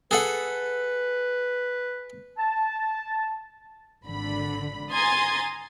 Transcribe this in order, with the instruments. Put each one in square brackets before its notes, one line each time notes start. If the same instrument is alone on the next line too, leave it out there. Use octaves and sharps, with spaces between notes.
[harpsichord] G#4 A4 F#5 [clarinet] B4
[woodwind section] A5
[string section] G#1 D3 B5
G#5 A#5 C6 D#6 G#6 A6